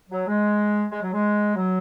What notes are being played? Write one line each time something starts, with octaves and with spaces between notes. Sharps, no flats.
F#3
G#3
G#3
F#3
G#3
F#3